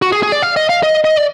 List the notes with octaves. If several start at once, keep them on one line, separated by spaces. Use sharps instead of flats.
F#4
G#4
G#4
D5
F5
D#5
F5
D#5
D#5
D5